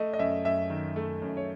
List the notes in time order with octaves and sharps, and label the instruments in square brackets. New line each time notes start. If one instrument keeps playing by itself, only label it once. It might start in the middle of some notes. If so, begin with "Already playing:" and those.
Already playing: [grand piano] A3 D#5
D#5
F#2 E5
F#2 E5
D#3
A3
F#2
C#5